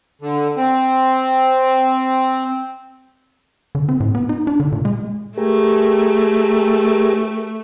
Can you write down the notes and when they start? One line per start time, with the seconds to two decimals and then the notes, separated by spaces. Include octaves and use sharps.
0.22 D3
0.57 C4
3.75 D3
3.89 C4
4.00 A2
4.15 B3
4.29 D#4
4.47 D4
4.60 D3
4.72 A#2
4.85 G#3
5.38 A3 G4 G#4 A#4